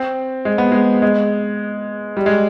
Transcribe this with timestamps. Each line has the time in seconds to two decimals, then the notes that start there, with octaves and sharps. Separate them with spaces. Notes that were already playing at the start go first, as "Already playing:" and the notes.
Already playing: C4
0.45 G#3
0.58 B3
0.72 G#3
1.02 G#3
2.17 G3
2.26 G#3